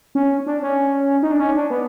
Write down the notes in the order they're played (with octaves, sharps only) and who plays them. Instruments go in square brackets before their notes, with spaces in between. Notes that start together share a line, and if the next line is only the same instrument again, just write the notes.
[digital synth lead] C#4
D4
C#4
D#4
D4
C#4
D4
B3